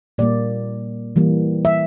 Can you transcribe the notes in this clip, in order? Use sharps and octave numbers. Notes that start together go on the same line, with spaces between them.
A#2 G3 A#3 D5
E3 G3 A#3
E5